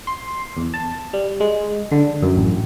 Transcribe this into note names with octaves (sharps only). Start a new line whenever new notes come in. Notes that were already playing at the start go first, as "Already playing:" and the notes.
C6
E2
A5
G3
G#3
D3
F#2
A1